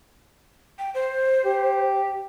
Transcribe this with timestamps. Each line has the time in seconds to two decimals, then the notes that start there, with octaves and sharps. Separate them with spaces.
0.79 G5
0.94 C5
1.45 G4